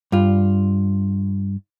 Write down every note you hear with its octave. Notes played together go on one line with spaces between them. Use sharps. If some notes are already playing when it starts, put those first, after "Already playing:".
G2 F4